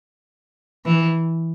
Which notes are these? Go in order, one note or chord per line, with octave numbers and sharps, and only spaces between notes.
E3